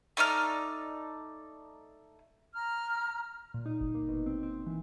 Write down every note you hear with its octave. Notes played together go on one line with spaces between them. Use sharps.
A3 D#4 D5 F6
A#5 F6
A#2
D#4
G1
A#3
B2
C4
C4
E3